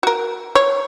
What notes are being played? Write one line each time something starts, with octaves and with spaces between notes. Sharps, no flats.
F#4 A#4
C#5